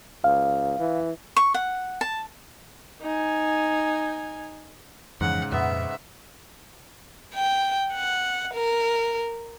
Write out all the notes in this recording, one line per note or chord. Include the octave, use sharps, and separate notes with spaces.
C#2 F5
E3
C#6
F#5
A5
D#4 G#5
F2 G#2 C#3 E3 F3 F#5
F2 A#2 B3 E5 F#5
G5
F#5
A#4